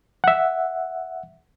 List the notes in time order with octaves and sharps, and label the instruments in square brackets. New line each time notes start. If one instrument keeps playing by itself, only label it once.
[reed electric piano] E5 F#5